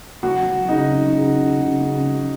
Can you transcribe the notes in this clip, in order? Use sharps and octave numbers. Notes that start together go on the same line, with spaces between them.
F#3 F#4
F#3
C#3 D#4
F#3
C#3
C#3
C#3
C#3
F#3